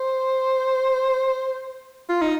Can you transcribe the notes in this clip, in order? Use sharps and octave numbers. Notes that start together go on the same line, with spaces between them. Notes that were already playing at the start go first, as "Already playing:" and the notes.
Already playing: C5
F4
D#4